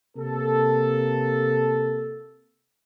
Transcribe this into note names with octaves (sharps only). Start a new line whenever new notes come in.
C3 A#3 A4